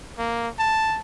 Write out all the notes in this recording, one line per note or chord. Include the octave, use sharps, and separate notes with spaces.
A#3
A5